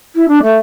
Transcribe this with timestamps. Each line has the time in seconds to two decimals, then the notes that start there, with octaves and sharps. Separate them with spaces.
0.15 E4
0.28 D4
0.42 A3